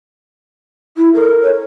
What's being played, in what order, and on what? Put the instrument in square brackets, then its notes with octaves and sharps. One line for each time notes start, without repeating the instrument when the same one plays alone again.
[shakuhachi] E4
[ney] A4 [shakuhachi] A#4
[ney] C#5